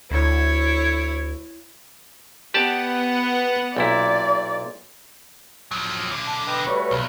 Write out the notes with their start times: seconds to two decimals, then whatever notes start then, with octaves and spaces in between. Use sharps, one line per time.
0.11 D2 E4 C#5
2.54 B3 G4 D5 F#5 A5
3.77 B1 A#2 E4 D5
5.71 F3 F#3
6.11 B1 D3
6.27 D4
6.47 B4 D#5 G5
6.66 G3 A3 F#4 B4 C#5
6.91 B1